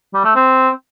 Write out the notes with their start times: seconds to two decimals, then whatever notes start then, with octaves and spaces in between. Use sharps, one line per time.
0.14 G3
0.25 A3
0.35 C4